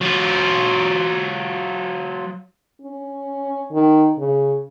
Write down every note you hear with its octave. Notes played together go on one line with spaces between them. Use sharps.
F#3 F4
C#4
D#3
C#3